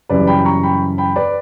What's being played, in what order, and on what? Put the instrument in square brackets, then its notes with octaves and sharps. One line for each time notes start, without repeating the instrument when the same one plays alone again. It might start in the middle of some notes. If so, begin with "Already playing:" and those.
[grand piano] F#2 C#3 E3 G3 B4 D5
G5 B5
A#5 C#6
G5 B5
G5 B5
B4 D5